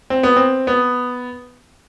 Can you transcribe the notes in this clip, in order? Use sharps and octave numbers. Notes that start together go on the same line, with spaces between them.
C4
B3
C4
B3